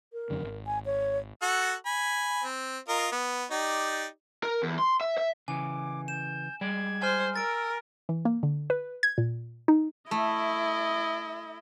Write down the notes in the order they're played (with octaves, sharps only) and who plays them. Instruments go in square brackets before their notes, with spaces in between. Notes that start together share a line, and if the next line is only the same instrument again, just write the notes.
[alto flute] A#4
[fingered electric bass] F1 F#2 D3
G#1
[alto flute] G#5
C#5
[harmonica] F#4 A4 F#5
G#5 B5
C4
F4 A#4 D#5
B3
D#4 G4 D5
[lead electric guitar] A#4
E2
C6
E5
E5
[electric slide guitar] C#3 E3 [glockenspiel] G#5 [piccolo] D6
[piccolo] G6 [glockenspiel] E7
[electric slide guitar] G3 G#3 D5 [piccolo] G#6
[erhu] C5 [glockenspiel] G#5 F6
[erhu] A#4 [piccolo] E6 [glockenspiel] A6 D7
[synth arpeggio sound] E3
A#3
D3
B4
G#6
A#2
D#4
[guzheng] A3 [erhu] E4 [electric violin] D#5